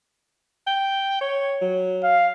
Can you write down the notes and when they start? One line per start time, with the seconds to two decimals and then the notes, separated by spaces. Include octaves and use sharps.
0.67 G5
1.21 C#5
1.61 F#3
2.03 F5